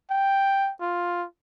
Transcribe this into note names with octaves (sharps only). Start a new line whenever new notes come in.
G5
F4